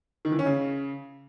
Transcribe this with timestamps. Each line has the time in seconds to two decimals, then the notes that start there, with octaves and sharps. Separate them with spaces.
0.25 D#3
0.32 E3
0.39 C#4
0.46 C#3